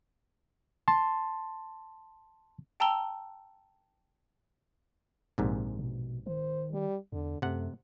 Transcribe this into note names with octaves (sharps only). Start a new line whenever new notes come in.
A5 C6
G5 A5 A#5 E6 G7
A#1 G#2 C3
B2
D#3 C5
G3
E2 D3
F#2 C3 A3 F#5